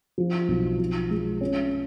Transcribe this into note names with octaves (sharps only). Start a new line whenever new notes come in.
F3
B1
F3
G#3
C#4